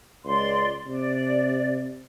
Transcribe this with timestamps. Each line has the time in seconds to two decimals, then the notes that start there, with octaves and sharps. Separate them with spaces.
0.25 C#2 D5 C6
0.87 C3 D5